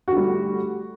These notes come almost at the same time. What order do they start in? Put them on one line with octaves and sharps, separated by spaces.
F#4 D3 G3 A3